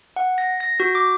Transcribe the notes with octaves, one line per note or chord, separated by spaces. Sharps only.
F#5
A#6
A#6
F#4
D6